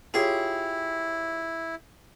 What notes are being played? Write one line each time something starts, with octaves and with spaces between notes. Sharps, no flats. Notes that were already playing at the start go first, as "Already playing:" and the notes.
E4 F4 G4 G#4 C#5